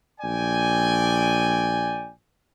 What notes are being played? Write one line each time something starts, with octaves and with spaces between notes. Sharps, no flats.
A#1 D5 G5 G#5